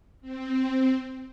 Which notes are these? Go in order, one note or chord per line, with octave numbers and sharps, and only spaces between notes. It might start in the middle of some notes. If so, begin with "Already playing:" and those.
C4